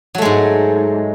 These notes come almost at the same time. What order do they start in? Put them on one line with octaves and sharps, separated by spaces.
F#3 A3 G#3 G#2